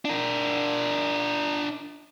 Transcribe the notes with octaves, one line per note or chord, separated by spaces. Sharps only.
D4 A#4